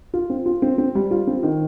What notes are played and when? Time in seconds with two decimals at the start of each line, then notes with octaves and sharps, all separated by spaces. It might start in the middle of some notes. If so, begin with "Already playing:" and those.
0.14 F4
0.30 C4
0.46 F4
0.62 C4
0.78 C4
0.95 G3
1.11 F4
1.27 C4
1.43 D#3